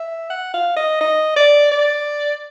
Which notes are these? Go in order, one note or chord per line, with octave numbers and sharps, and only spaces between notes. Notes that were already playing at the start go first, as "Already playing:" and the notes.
Already playing: E5
F#5
F5
D#5
D#5
D5
D5